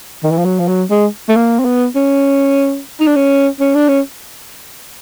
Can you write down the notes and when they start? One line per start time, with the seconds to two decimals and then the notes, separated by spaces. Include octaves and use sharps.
0.24 D#3
0.31 E3
0.38 F3
0.45 F#3
0.60 F3
0.68 F#3
0.90 G#3
1.29 A3
1.36 A#3
1.60 C4
1.65 B3
1.96 C#4
3.00 D#4
3.07 D4
3.16 C#4
3.60 C#4
3.75 D4
3.88 C#4